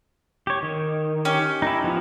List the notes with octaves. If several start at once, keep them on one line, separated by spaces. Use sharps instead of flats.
G4 C#5
D#3
C#4 G4
D#4 E4
F3 B3 D#4